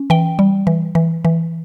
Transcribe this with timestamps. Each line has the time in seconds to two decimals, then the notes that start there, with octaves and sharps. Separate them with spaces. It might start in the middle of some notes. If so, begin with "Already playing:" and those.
Already playing: C#4
0.10 E3 G5
0.39 G3
0.67 E3
0.95 E3
1.25 E3